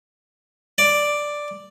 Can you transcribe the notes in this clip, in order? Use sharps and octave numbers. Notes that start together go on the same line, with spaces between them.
D5